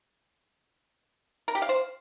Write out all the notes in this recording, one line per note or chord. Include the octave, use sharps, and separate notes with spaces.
A#4
G4
F5
C5